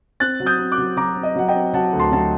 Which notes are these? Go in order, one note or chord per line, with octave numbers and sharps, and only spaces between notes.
C4 F#6 A6
F#3
D#6 G6
C4
D6 F#6
F#3
F#3 A#5 D6
C4
D#5
F#3 F#5
D#5 G5
C4
F#3 F#5 A5
D2
A5 C6
F#3 A5